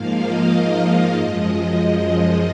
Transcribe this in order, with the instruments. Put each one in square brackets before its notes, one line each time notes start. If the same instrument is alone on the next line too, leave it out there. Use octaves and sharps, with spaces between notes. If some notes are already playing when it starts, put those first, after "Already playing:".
Already playing: [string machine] G#2 F3 A#3 F5
D#5
F5
F#2 F3 G#3 D#5